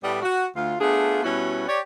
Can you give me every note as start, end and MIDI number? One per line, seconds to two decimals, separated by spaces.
0.03 0.20 45
0.03 0.20 55
0.03 0.20 59
0.22 0.46 66
0.56 0.74 38
0.56 0.74 65
0.80 1.23 57
0.80 1.23 59
0.80 1.23 62
0.80 1.23 65
0.80 1.23 68
1.23 1.66 47
1.23 1.66 55
1.23 1.66 59
1.23 1.66 61
1.23 1.66 64
1.23 1.66 66
1.68 1.80 67
1.68 1.80 73
1.68 1.80 74